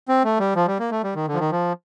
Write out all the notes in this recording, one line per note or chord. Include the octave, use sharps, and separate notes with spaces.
C4
A3
G3
F3
G3
A#3
A3
G3
D#3
D3
F3
D#3
F3